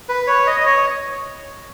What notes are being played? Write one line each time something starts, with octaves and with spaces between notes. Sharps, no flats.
B4
C#5
D#5
D#5
C#5